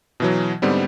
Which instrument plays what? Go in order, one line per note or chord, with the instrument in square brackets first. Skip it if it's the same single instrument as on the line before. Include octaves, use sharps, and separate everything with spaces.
[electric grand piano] B2 E3 F#3
G#2 D3 G3 B3 C4